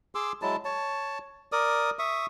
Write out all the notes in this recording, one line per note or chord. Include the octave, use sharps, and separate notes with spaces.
G#4 C6 D6 E6
F#3 G#3 E4 A5
C#5 A5
A#4 D5 D#6
E5 C#6 D#6